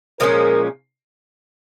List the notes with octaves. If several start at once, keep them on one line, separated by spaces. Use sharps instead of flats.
A#2 F3 G#3 C#4 A#4